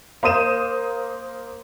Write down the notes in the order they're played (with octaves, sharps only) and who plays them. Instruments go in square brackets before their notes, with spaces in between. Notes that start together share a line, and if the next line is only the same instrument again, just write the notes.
[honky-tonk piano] A#3 C5 D#6 D#7 E7